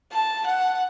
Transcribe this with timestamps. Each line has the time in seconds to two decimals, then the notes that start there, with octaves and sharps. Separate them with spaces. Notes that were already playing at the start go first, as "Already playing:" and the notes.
0.12 A5
0.47 F#5